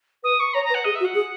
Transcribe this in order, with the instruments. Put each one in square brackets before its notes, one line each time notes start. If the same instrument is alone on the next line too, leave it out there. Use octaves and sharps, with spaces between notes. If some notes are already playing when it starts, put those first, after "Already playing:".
[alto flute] B4 [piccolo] D#6
[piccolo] C#6
[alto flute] C#5 [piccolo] A#5
[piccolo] A#5
[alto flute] B4
[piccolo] F#5
[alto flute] G#4 [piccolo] D#5
[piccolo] E5
[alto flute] F#4
[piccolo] F#5
[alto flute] G#4